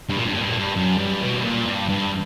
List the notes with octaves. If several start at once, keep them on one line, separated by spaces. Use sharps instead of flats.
G2
A#2
G2
A#2
G2
A#2
G2
F#2
G2
B2
G2
A#2
G2
G2